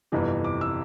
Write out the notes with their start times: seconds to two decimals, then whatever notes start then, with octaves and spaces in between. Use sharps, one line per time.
0.12 G1 F2 C3 E3
0.44 D6
0.61 E6